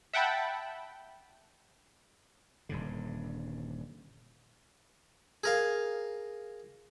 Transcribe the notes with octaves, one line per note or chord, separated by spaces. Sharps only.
E5 F#5 G5 A5 B5
D#1 G2 D3
G#4 A#4 F5